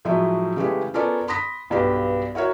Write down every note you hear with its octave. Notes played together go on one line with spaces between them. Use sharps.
A2 F3 F#3 G#3 A3 E4
C#3 E3 G#3 A3 C#4 G4
B3 C#4 F4 A4 A#4 D5
B5 C6 D#6 A#6 B6
B1 G2 B3 G4
E4 F#4 A#4 C#5